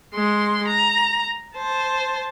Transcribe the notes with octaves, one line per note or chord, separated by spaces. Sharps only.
G#3 C6
A#5
C5 A5